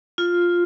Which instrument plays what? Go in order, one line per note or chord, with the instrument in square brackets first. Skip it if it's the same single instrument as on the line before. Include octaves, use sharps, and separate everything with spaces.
[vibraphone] F4